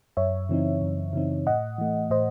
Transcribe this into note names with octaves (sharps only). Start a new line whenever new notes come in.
F#2 C#5 E5
C#3 E3 C4 D#4
F#2
C#3 E3 C4 D#4
A2 D#5 F#5
E3 A3
A2 C5 D#5